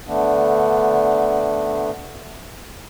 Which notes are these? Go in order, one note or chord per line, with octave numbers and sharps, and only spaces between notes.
D3 A3 B3 D4